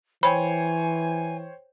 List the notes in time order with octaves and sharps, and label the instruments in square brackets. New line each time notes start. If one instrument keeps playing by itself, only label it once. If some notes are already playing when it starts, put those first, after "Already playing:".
[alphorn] E3 [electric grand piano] C5 C#5 G5 [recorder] G#5 [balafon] B5